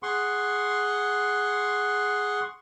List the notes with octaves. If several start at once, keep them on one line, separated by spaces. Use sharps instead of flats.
G#4 F#5 C6 C#6